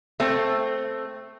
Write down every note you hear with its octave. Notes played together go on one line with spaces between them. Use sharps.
A3 C4